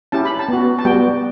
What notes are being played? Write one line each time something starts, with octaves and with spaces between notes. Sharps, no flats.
C#4 E4 G4 A5
B5
A5
B3 F#4
A5
G3 B3 F#4 G5